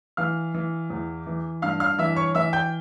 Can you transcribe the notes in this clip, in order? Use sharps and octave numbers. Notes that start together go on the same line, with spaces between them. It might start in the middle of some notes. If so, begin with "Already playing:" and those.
E3 F5 F6
E3
E2
E3
G2 F5 F6
F5 F6
E3 E5 E6
C#5 C#6
E3 E5 E6
G5 G6